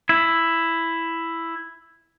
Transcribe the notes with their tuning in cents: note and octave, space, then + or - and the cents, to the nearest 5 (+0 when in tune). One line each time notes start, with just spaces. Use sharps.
E4 +5